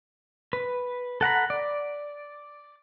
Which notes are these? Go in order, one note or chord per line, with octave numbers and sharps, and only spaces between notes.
B4
A4 F#5 A#5 B5
D5